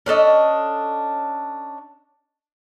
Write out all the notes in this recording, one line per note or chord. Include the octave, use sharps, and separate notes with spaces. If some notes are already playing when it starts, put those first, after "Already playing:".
C#4 D4 A4 D#5